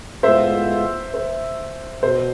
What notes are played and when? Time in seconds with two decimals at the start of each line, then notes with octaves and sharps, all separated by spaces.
0.23 A2 G#3 B3 F4 C5 E5
1.14 C5
2.02 B2 C5